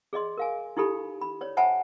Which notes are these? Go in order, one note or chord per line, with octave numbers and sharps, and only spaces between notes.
G#4 D5 D#5 C6
A#4 F5 G#5
D#4 E4 G4 A4 B5
B5
C#5 D5
C5 E5 F#5 G#5 A5 B5